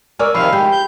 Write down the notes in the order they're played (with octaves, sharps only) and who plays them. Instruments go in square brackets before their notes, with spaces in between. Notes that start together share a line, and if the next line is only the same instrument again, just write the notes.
[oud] A#4 D5 [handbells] G#5 C#6 E6
[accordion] C3 D#3 F5 [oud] F3 [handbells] B5
[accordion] G#3 [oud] G4
[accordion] G6